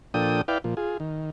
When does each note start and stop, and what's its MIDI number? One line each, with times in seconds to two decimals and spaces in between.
0.14 0.42 46
0.14 0.42 53
0.14 0.42 62
0.14 0.42 69
0.14 0.42 79
0.14 0.42 87
0.48 0.58 64
0.48 0.58 71
0.48 0.58 74
0.48 0.58 77
0.48 0.58 79
0.64 0.75 46
0.64 0.75 53
0.77 0.98 65
0.77 0.98 68
1.00 1.30 51